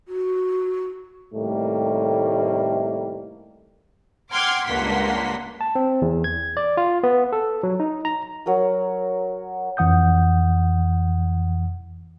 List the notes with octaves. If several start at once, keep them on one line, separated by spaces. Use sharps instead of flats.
F#4
A2 C3 D#3 G3 A3 A#3
F#5 G5 C6 D6 F6 G#6
C#2 G2 A#3 F#5 C6 B6
A5
C4
E2
G#6
D5
F4
B3
A4
F#3
D#4
A#5
F#3 A#4 D#6
F2 E3 F#5 D#6 G6